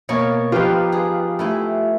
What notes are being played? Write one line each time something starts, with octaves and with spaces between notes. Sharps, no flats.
B2 A#3 C#5
F3 D#4 F4 G4 B4
G#4
A3 E4 G#5